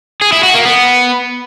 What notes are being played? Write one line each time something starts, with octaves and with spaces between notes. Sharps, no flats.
G#4
E4
F#4
A#3
B3